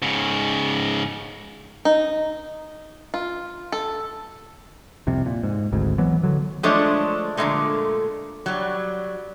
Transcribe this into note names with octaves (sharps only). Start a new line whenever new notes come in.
G#2 C#3
D#4
F4
A4
C2 F2 C3
A#2
G#2
G#1 D2 G#2
E3 F#3 B3
D3 F#3
F3 G#3 A3 D4 C5 C#5
A#2 D3 E3 F#3 G#3 A3
F#3 G3